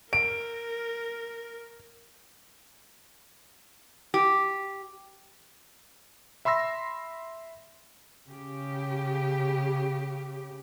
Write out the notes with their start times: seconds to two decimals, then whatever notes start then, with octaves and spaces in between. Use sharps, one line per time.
0.13 A#4 D7
4.14 G4
6.45 E5 B5 C6 E6 A#6
8.30 C#3 G4